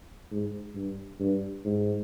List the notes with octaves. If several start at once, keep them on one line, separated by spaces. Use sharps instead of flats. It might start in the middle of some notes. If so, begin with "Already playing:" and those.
G#2
G2
G2
G#2